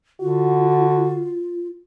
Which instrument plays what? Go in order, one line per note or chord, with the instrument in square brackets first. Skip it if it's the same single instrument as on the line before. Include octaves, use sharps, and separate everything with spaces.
[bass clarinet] D3 [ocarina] F4 [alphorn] F#4